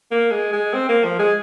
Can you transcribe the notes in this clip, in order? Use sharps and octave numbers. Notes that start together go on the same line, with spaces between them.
A#3
G#3
G#3
C4
A#3
F3
G#3